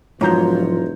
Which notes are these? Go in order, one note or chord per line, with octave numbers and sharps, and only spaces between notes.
E1 G#2 F3 F#3 F4 C#5 A#5 G6